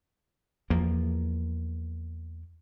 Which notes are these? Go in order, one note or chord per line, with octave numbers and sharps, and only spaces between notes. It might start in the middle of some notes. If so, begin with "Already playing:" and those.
E2 F3 A#3